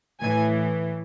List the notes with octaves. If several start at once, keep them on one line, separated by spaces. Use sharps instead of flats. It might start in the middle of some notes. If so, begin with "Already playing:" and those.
A2 E3 G#5